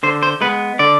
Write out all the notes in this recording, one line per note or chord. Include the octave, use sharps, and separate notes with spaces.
D3 C5
C5
G#3 B3 B4
D3 D5